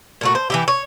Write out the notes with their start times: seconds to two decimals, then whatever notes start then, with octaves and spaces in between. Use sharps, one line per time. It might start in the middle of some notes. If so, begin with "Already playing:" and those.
0.21 A#2 A3 F#4
0.35 C5
0.50 E3 E4 G4
0.68 C#5